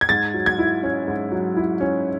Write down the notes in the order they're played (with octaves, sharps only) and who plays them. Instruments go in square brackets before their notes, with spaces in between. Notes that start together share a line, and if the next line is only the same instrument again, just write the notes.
[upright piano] G#6
G#2 A6
F#3
G#6
E4
C#4
G#2
F#3
E4
C#4